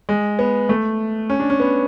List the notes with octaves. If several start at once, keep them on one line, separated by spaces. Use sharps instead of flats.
G#3
B3
A3
C#4
D4
C#4
B3